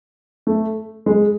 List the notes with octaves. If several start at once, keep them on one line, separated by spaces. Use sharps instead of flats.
A3
G#3